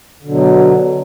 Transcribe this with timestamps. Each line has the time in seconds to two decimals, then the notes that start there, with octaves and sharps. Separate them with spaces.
0.22 D3
0.25 B2
0.29 F#3